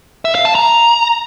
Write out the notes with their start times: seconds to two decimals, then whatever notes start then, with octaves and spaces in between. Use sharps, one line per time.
0.25 E5
0.35 F5
0.45 A5
0.55 A#5